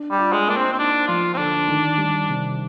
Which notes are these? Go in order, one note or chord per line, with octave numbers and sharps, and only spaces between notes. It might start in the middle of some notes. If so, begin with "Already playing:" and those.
Already playing: D4
G3
F4
G#3
A#3 D4
C4
C4
D4 D#4
F3 F4
C4
D3 D4
D#3
G3
C3